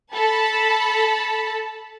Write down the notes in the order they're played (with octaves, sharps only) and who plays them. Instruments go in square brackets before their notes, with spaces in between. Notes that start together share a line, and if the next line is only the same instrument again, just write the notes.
[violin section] A4 A5 B5